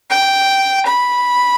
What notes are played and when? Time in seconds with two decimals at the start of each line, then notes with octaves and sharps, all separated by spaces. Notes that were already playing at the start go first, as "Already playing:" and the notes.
0.10 G5
0.86 B5